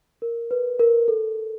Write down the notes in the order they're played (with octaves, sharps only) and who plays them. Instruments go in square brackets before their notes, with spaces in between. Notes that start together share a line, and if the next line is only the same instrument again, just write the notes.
[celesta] A#4
B4
A#4
A4